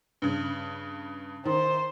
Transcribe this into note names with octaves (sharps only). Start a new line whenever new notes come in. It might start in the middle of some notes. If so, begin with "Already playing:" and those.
G2 C#3
D#3 C5